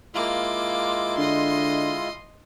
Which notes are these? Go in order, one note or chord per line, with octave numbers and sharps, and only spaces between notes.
G#3 A#3 E4 F4 D6
D3 D#5 C6